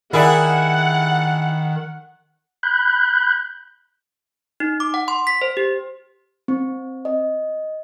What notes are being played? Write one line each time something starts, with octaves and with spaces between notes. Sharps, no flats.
D#3 E4 G#4 A#4 D5 E5 F#5
B5 F#6 G6
D#4
D6
F#5
C6
B6
C5
G4
C4
D#5